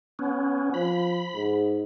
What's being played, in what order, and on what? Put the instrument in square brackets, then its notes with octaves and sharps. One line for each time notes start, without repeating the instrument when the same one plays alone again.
[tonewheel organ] B3 C#4
[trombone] F3 [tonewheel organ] B5
[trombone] G#2